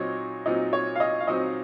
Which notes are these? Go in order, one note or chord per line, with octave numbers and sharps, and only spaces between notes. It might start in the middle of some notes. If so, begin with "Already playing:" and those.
Already playing: A#2 F#3 C4 D#4 C#5
A#2 F#3 C4 D#4 D#5
C#5
F5
D#5
F5
A#2 F#3 C4 D#4 D#5